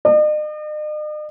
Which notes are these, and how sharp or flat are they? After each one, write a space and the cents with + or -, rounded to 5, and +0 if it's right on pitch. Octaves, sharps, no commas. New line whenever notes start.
D#5 -45